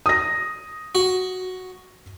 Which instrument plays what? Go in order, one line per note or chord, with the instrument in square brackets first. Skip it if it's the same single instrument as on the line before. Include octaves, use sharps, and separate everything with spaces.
[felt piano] D#6 A#6
[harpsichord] F#4